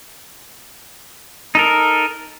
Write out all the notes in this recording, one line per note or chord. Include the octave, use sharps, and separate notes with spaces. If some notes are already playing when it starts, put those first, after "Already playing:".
D#4 A4 A#4